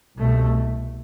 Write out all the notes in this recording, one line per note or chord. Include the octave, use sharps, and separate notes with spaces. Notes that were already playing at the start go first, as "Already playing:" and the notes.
C2 B2 A3